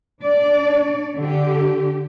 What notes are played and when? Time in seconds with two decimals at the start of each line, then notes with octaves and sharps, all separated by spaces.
0.21 D4 D5
1.18 D3 G4